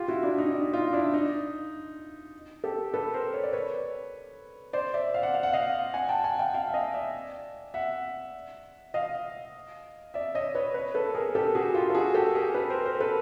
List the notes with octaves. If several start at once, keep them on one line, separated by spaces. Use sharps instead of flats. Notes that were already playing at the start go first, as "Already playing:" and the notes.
Already playing: F4 G4
E4 F#4
D4 E4
D#4
D#4
D#4 F4
D4 E4
D#4
G4 A4
A4 B4
A#4 C5
C#5
D5
B4 C#5
C5 D5
D5 E5
F5
F#5
F5
F#5
D#5 F5
F#5 G#5
G5 A5
F#5 G#5
F5 G5
F5 G5
E5
D#5 F5
D5 E5
E5 F#5
D#5 F5
D5 E5
C#5 D#5
B4 C#5
B4 C#5
A4 B4
G#4 A#4
G4 A4
F#4 G#4
F4 G4
A4
F#4 G#4
G4 A4
G#4 A#4
A4 B4
A#4 C5
A#4 C5
A4 B4